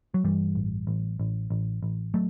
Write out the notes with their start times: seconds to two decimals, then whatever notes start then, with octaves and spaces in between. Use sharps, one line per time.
0.14 F#3
0.24 G2 E3 G3
0.55 A1
0.87 A1
1.19 A1
1.50 A1
1.83 A1
2.14 F#3 A3